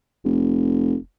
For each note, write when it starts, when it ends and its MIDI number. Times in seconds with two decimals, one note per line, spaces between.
0.25 0.95 29